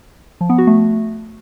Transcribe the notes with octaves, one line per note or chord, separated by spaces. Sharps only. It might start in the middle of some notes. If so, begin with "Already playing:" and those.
F3
B3
F#4
A3